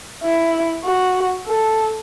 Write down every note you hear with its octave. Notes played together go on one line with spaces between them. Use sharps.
E4
F#4
A4